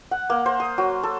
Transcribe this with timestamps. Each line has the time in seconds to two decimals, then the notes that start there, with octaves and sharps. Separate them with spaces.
0.11 F#5
0.30 A#3
0.46 C5
0.60 D#6
0.78 F#3
1.03 A4